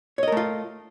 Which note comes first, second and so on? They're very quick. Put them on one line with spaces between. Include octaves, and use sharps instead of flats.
C#5 D#5 A#4 A3 F4